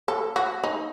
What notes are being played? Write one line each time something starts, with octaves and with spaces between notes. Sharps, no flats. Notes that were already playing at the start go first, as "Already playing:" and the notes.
A4
F#4
D#4